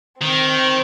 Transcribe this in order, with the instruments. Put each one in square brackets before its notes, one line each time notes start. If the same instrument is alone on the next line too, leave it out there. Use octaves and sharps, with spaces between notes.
[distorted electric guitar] D#3 [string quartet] C4